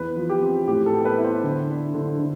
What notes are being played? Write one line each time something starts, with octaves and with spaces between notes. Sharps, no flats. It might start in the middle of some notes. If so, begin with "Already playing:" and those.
Already playing: E2 B4
F3
G4
C4
A2 G4
A4
B3
B4
E4
C5
D3
D4
D3
D3